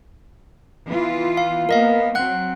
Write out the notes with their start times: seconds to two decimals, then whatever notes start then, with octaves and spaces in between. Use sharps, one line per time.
0.87 E3 B3 F4
1.37 F5
1.69 A#3 B3 A#4 D#5 F5
2.15 F#3 C4 F#5 F#6